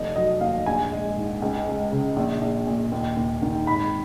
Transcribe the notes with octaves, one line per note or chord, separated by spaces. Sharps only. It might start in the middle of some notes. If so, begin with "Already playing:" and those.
Already playing: F1 D#5
F#3 D#5
D#2 F5
A#1 G#5
G#3
G#2
C#2
C#2
C#3
A#1
A#1
A#2
D#2
D#2
D#3
G#1 B5